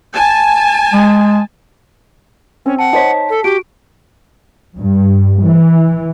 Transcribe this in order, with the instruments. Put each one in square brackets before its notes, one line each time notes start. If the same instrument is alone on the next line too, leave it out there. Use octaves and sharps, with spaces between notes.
[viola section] G#5 A5
[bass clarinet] G#3
[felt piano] C4 [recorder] C#4
[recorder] F#5 [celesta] A5
[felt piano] D#4 C5 C#5 [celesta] A5 B6
[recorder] A4
[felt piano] F#4 [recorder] G4 [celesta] D7
[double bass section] G2
E3